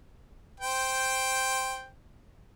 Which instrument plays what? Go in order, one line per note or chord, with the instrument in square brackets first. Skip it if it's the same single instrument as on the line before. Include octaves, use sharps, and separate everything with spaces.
[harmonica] C5 G5